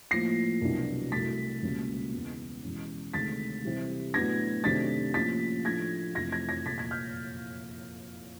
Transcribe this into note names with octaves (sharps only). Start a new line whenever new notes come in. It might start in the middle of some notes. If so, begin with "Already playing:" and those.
A2 F3 A#3 A#6 C7
C2 B2 F#3 B3 D4
C2 B2 F#3 A3 A6 B6
C#2 B2 G3 A#3 C#4
E2 C#3 E3 G#3 B3
E2 B2 G#3 C#4
D2 C3 D#3 G#3 A6 B6
C3 E3 G3
A2 F#3 B3 D4 G#6 A#6
C3 D#3 F#3 A3 D4 A6 B6
A2 F3 A#3 C#4 A6 B6
A2 F3 A3 D4 G#6 A#6
F2 C3 E3 A3 G#6 A#6
G#6 A#6
G#6 A#6
C2 A#2 F3 A#3 A6 B6
G#6 A#6
F6 G6